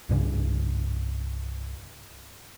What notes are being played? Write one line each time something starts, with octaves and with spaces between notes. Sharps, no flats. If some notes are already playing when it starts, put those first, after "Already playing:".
C2 G2 C#3